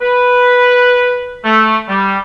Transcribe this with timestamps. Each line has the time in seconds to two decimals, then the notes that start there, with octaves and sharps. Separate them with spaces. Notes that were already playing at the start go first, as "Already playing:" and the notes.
0.02 B4
1.45 A3
1.89 G3